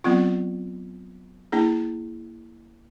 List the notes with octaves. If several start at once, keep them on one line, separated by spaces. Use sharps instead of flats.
F#3 B3 C4 F4
A#3 D4 E4 G#4